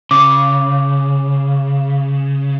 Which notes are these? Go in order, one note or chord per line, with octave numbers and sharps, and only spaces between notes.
C#3 D6